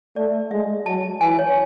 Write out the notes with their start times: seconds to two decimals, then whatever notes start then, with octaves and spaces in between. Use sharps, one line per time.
0.16 A3 D5
0.51 G#3 E5
0.86 F#3 A5
1.21 E3 G#5
1.39 C#5